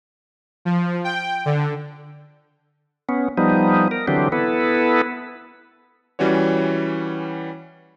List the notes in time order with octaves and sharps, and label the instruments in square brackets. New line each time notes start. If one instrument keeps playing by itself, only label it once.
[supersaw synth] F3
G5
D3
[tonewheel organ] B3 C#4
F3 G3 B3 D#4
A#4
D3 E3 F#3 C4 D4 G4
B3 E4 A4 B4
[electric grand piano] E3 G3 C#4 F#4 C#5